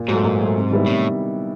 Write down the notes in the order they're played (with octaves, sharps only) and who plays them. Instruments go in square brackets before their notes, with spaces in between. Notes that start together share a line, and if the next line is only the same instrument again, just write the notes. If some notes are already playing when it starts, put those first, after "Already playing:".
Already playing: [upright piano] A#2
[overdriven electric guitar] G#2 [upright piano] F#3 A3
[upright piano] A#2
F#3 A3
C3
D#3 G3 B3 E4
[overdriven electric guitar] A2 [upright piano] C3